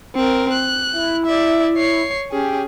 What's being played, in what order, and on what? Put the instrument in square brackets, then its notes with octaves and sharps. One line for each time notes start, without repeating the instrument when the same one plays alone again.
[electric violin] C4 A#4
F#6
[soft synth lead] E4
[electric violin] D5 E5
C#5 C7
[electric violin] C#4 G#4 [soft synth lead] G4